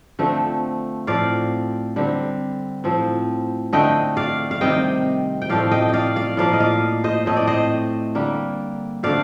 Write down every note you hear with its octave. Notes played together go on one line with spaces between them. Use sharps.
D3 F3 A3 C4
A2 F3 C4 D5 F5
D3 G3 C4
A2 F3 C4
D3 A3 C4 D#5 G5
D5 F5
F5
C3 D#3 G3 C4 D#5 G5
G5
A2 F3 A3 C4 D5 F5
D#5 G5
D5 D#5 F5
D5 F5
A2 F3 A#3 D5 F5
D#5
D5 F5
C5 D#5
A2 A3 C4 D#5
D5
C5 D#5
D3 G3 A#3
D3 A3 C4 D5 F5